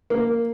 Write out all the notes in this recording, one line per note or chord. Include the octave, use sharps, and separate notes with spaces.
A#3